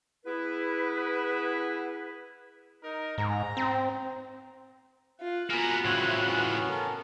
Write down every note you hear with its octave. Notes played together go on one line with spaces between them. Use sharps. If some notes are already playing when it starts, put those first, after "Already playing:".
B3 E4 G#4 B4
D#4 A#4
G#2 A#5
C4
F4 F#6
A#3 B3 F4 F#4 G#4 A#4 A#5
A2 C#3 C4 C#5 E5
B3 C#4
A4 A#4